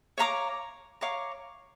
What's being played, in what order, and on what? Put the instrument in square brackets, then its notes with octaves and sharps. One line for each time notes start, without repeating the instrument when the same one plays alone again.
[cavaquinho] C#5 F5 A#5 D6
C#5 F5 A#5 D6